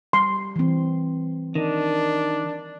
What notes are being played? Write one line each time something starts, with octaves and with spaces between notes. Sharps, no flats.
G3 C6
E3 C4
D#3 D4